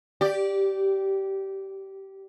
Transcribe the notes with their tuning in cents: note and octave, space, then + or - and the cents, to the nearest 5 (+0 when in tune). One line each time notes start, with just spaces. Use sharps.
G4 -15 D5 +0